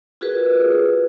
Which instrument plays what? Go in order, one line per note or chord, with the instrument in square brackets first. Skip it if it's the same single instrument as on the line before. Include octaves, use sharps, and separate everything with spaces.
[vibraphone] F4 F#4 G#4 A#4 B4